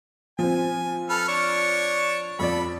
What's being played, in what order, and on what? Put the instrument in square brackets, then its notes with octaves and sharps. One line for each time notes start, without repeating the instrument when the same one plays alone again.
[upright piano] F3 C4 [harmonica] G#5
[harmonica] A4 B4 F6
D4 C#5 C#6
[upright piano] F2 F3 D5 [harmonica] A4 B5